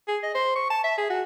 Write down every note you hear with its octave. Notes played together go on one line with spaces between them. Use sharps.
G#4
D#5
C5
C#6
A5
E5
G#4
F#4